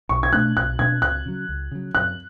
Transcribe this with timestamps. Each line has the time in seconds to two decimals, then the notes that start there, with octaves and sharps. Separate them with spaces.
0.09 B1 C#6
0.23 G#6
0.33 B2 A3 D4 F#6
0.56 B1 F#6
0.79 B2 A3 D4 G#6
1.02 C#2 F#6
1.26 C#3 F#3
1.49 C#2
1.71 C#3 F#3
1.95 F#2 F#6